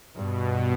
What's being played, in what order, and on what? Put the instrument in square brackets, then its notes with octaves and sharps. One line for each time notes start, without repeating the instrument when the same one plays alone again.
[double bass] G2 [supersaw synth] B2